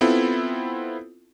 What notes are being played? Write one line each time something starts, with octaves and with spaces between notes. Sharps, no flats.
B3 C4 E4 F4 A4